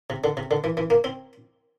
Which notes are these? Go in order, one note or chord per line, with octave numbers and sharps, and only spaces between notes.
C3
D3
C3
D3
E3
E3
A#3
C4